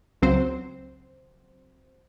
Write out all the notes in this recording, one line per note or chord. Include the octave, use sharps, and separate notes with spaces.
C#2 F#3 C4 C5